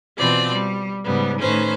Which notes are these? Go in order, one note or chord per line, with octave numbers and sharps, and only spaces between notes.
B2 E3 C4 F4 D5
G3
G#2 C#3 G3 B3
A2 D#3 A3 C#4 B4 C5